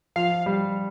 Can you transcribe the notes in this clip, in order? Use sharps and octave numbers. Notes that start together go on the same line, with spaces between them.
F3 F5
G3